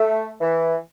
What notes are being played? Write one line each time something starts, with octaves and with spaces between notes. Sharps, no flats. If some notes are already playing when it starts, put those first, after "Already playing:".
Already playing: A3
E3